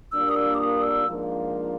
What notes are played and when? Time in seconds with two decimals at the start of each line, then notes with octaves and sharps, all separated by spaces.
0.11 A#2 G3 A#3 D4 E6
0.29 D#6
0.35 E6
0.55 D6
0.59 D#6
0.82 E6
1.05 G#2 F3 A#3 D4 F4